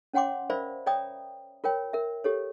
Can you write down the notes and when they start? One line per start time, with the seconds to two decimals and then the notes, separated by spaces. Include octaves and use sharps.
0.13 C#4 C#5 F#5 G5 C6 D6
0.50 A#4 C5 D5 E5 F5 B5
0.86 C#5 D5 E5 G5 A#5 D#6
1.64 F4 A#4 C#5 G5
1.93 A#4 E5
2.24 G4 A4 C#5